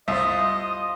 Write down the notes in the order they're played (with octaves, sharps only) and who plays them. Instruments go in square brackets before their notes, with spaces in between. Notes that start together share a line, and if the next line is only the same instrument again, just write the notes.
[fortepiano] C2 E5 [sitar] F4 C5 [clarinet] D#5 [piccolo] D#6